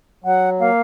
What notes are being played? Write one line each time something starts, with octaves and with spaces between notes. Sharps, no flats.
F#3 F#5
A#3 F5